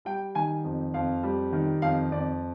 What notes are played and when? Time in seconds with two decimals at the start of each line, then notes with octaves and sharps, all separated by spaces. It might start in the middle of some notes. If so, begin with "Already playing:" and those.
0.05 G3 G5
0.35 D#3 G#5
0.64 F2
0.94 F2 F5
1.23 G3
1.53 D#3
1.82 F2 F5
2.12 F2 D5